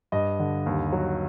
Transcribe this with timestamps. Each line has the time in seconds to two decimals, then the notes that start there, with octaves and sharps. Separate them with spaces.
0.12 G2 D#5
0.39 D3
0.66 D#2
0.92 F#3